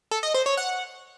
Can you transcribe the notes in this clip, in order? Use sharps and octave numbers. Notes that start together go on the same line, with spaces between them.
A4
D#5
C5
C#5
F#5